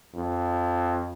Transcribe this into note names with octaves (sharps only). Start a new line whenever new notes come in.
F2